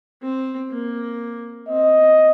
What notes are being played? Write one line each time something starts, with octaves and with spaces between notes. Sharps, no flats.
C4
A#3
C4 D#5